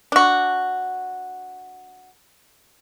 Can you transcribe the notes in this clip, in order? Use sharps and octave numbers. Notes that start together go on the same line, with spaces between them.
D4 F#4